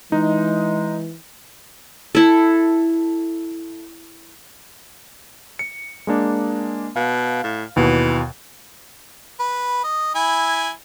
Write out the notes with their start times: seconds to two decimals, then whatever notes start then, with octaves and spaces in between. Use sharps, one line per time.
0.12 E3 G#3 D#4
2.15 E4 A4
5.59 C#7
6.07 G#3 A#3 D4
6.96 B2 F5
7.44 A2
7.76 D#2 B2 E3
9.39 B4
9.84 D#5
10.15 E4 G#5 B5